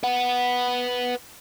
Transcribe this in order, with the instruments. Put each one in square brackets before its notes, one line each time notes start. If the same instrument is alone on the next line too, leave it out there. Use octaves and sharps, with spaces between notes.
[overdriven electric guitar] B4 F#5